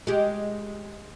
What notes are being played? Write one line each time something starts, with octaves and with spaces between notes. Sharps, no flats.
G#3 G4